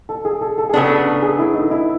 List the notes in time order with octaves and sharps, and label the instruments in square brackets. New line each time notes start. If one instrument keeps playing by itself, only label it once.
[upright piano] A4
G#4
A4
A4
G#4
[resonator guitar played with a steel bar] C#3 F#3 B3 D4 [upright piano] A4
[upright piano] A4
A4
G#4
E4
D#4
E4